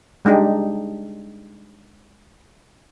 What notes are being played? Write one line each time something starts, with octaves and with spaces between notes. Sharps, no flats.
G3 G#3 D4 D#4 G4